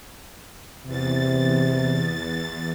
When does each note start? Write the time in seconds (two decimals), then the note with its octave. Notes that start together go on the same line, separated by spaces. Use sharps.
0.86 E2 C3 A6